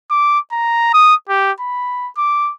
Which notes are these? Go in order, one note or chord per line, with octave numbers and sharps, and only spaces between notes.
D6
A#5
D#6
G4
B5
D6